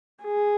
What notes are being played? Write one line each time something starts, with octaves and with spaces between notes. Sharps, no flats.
G#4